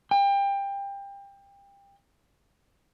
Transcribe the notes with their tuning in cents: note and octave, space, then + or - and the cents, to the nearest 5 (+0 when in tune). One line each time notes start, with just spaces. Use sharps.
G5 +25